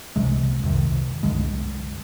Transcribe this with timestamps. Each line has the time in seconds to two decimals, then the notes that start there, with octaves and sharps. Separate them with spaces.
0.16 C2 C3 E3 G#3
0.63 C2 F2 C3 D#3
1.23 C2 F#2 D3 G#3